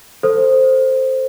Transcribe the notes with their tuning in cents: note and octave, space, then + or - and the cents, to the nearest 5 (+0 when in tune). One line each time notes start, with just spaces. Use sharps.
A4 +15 C5 +0